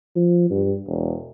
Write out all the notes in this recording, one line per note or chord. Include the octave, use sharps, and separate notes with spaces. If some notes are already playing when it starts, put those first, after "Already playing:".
F3
G2
E1